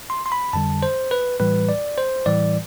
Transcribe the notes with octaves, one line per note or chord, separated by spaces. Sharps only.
C6
C6
B5
F2 D3 G3 A5
C5
B4
A2 E3 G3 B4
D5
C5
A2 E3 G3 D5